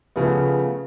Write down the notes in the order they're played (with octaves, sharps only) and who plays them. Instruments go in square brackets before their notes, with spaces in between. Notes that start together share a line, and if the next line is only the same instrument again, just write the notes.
[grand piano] C#3 F3 A3 B3